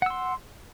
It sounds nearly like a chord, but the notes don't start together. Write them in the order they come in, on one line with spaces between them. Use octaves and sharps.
F#5 E6 C6